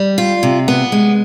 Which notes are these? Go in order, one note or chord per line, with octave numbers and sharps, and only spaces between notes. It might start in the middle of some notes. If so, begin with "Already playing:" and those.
Already playing: G3
F4
C3
B3
G#3